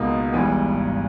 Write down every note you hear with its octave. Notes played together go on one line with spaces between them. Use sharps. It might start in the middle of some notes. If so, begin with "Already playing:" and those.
Already playing: C#2 B2 A#3 D#4
G#1 G#2 E3 G3 B3